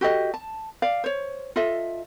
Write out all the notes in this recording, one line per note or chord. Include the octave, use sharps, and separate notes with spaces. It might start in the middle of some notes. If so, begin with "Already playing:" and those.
F#4 G4 A4 D#5
A5
D5 F5
C5 C#5
F4 A4 D#5 E5